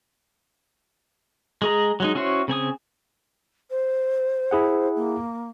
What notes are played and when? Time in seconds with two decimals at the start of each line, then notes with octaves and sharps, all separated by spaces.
1.62 G#3 G#4 A#5
2.00 F#3 G#3 D#4
2.15 C#4 E4 F#4 C5 C#5
2.48 C#3 C4 G#5 D#6
3.70 C5
4.51 E4 G#4 F#5
4.96 A#3